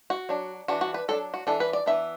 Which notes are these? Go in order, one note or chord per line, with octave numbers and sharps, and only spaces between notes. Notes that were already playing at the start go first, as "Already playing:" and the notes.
F#4
F#3 D4
E3 D4 F#4
F#4
B4
F#3 D4 A4
F#4
E3 D4 A4
B4
D5
E3 B3 D4 E5